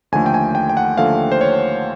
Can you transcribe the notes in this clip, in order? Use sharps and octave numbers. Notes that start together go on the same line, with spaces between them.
D#2 D3 F3 A3 G#5
G5
G#5
G5
G5
F#5
D#2 D3 F3 A3 F5
C5
C#5